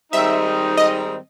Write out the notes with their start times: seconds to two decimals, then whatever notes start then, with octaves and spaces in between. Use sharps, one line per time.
0.13 G#2 D#3 G3 C4 D#4 E5
0.77 D#5